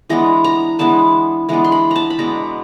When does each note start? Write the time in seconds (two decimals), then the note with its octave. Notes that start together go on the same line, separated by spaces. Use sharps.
0.09 E3 G#3 B3 D4 A#5
0.44 A#5
0.79 E3 G#3 B3 D4 A5
1.49 E3 G#3 B3 D4 A#5
1.64 C6
1.72 B5
1.91 A5 A#5
2.10 B5
2.19 B2 G#3 B3 D4 A#5